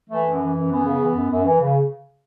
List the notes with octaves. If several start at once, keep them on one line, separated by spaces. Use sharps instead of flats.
E3 A3
F#2
E3
F#2
E3 B3
C#3
E3
F#2
F#2
E3
C#3